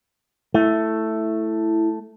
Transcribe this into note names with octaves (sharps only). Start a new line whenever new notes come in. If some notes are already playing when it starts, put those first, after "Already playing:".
A3 E4